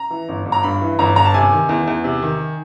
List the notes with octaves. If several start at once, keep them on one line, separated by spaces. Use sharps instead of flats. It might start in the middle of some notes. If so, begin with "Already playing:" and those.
Already playing: A#5
E3
G1
G1
A#5
G2 B5
E3
G1 A#5
G1 A#5
A5
C3 G#5
D#3
E2
E2
C3
D#3